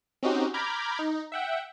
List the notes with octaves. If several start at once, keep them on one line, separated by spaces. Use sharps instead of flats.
C4 C#4 D#4 F#4 G4
A#5 B5 D6 F6 G6 G#6
D#4
E5 F#5 G5